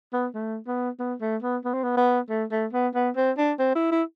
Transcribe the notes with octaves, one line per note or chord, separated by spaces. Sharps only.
B3
A3
B3
B3
A3
B3
B3
C4
B3
B3
A3
A3
B3
B3
C4
D4
C4
E4
E4